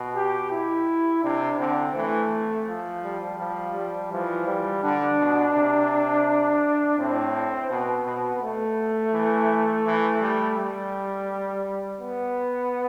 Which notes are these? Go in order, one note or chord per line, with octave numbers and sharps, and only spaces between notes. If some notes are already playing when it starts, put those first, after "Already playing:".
Already playing: B2
G4
E4
C3 D4
D3 C4
E3 A3
F3
G3
F3 G3
G3
E3 F3
G3
D3 D4
B2
C3
A2 C4
B2 B3
B2
A3
E3
E3
G3
G3
B3